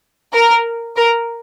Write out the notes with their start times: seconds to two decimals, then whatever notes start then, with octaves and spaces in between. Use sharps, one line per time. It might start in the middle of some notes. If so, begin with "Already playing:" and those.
0.33 A#4
0.97 A#4